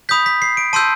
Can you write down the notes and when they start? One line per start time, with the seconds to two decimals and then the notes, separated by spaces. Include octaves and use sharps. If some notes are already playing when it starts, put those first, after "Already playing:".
0.09 B5 D#6 G6 B6
0.26 B6
0.42 C7
0.57 D7
0.73 A5 C6 E6 G6 D#7